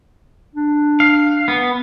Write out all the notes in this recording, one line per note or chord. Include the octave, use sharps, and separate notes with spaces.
D4
F5
B3